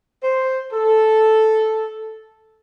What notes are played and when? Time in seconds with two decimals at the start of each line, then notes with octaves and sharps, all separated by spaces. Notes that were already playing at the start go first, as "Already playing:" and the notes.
0.22 C5
0.72 A4